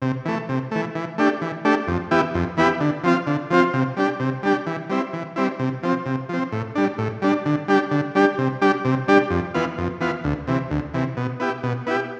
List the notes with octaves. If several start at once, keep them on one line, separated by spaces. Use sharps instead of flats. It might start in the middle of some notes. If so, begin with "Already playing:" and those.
C3
E3 A3
C3
E3 A3
E3
A3 D4 G4
E3
A3 D4 G4
F2
E3 B3 E4 G4
F2
E3 B3 E4 G4
D3
F3 C4 F4
D3
F3 C4 F4
C3
G3 D4 G4
C3
G3 D4 G4
E3
G3 C4 E4
E3
G3 C4 E4
C3
F3 C4
C3
F3 C4
A2
G3 D4
A2
G3 D4
D3
G3 D4 G4
D3
G3 D4 G4
C3
G3 D4 G4
C3
G3 D4 G4
F2
E3 B3 F4
F2
E3 B3 F4
D2
C3 E3
D2
C3 E3
B2
B3 E4 G4
B2
B3 E4 G4